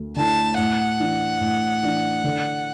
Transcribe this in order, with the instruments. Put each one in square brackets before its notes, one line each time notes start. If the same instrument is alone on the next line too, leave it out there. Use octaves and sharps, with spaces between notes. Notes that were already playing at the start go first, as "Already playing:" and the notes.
Already playing: [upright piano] D2 A3
[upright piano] D3 A3 E4 [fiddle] A5
[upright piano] A2 [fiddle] F#5
[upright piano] E3 D4
A2
E3 D4
D3